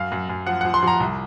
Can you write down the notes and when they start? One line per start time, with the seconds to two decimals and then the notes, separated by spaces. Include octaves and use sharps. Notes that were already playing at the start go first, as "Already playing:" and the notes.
Already playing: F#2 F5
0.12 F#2
0.29 F#2
0.46 F3 F#5
0.61 F3 F#5
0.74 C6
0.83 F3 A#5
1.00 C2